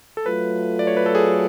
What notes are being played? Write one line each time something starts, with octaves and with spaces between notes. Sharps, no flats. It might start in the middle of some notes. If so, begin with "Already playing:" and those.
A4
F#3 A3 F4 B4
D5
C#5
B4
A4
G#4